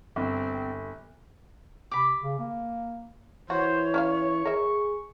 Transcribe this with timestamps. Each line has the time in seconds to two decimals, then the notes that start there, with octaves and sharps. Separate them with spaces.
0.16 G1 C4
1.91 C3 B5 D6
2.22 C#3
2.39 A#3
3.50 E3 F#4 C5 C#5
3.94 C#4 E5 F5 C#6
4.45 G#4 A#4 E5